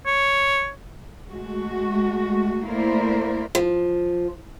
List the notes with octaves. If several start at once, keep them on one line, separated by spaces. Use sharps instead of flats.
C#5
G#3 A3 F#4
A3 A#3 E4 A#4 C5 D5
F3